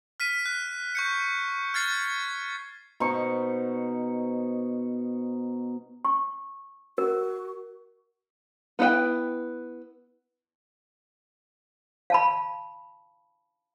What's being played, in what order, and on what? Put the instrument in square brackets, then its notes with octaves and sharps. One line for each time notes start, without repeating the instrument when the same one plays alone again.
[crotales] F6 B6 D#7
F#6
C#6 G6 C#7
F6 G#6 A6 C7
[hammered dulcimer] B2 D#4 C5 C#6
[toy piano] C#6
[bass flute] F#4 [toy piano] A#4
[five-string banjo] B3 E4 B4 F#5 G5
[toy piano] F5 A5 B5